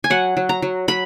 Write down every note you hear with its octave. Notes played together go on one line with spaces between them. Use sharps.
G#5
F#3 F#5
F#3
A#5
F#3
F#3 B5